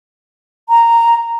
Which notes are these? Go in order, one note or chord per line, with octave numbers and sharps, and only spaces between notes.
A#5